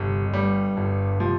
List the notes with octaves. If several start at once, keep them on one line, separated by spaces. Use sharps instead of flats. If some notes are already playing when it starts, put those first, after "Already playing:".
Already playing: G1 C3
F2
G2 G3
G1
C3 F3